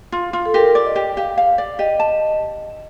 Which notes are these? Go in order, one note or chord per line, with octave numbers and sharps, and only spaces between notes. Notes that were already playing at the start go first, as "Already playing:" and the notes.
F4
F4
A4
G4 A#4
D5
D#5
G4
G4 F5
F5
D5
G4 D#5
A5